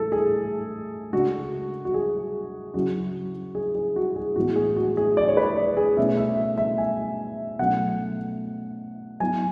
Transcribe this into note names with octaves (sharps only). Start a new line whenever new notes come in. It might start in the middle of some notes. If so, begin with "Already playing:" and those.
Already playing: A2 E3 G#3 A4
G#4
C#3 G#3 D4 F#4
F#4
G#4
C#3 F#3 C#4 E4 F#4
G#4
G#4
F#4
G#4
A2 E3 G#3 B3 F#4
G#4
F#4
G#4
D5
C#5
B4
D5
G#4
B2 A3 C#4 E4 E5
E5
E5
G#5
B2 F#3 A3 C#4 F#5
F#3 B3 E4 G#5